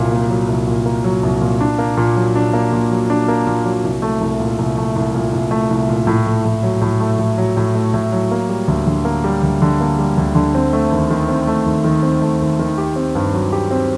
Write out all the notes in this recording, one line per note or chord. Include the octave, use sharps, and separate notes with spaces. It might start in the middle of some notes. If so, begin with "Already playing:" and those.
Already playing: C2 A#2 F#3 A#3
A#3
F#3
C2
A#2
A#3
F#3
C2
A#2
D4
A#3
A#2
F#3
D4
A#3
A#2
F#3
D4
A#3
A#2
F#3
C2
A3
C2
A#2
C2
A3
C2
A#2
C2
A3
C2
A#2
A2
A3
A2
F#3
A2
A3
A2
F#3
A2
A3
A2
F#3
A#3
G3
D2
D3
A#3
G3
D2
D3
A#3
G3
D2
D3
C4
A3
D#2
D#3
C4
A3
D#2
D#3
C4
A3
D#2
D#3
G4
C4
G2
F#3
G4
C4